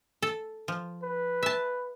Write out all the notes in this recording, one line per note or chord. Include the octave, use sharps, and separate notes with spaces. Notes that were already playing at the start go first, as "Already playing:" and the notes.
A4
F3
B4
E5 A5